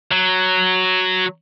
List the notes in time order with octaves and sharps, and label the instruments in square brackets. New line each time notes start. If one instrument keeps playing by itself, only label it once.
[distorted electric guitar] F#3